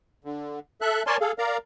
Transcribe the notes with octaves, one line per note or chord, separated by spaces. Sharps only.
D3
A4 E5 F#6
A#4 C#5 D5 G#5 A5 C6
G#4 A4 F5
A#4 D5 F5 A#5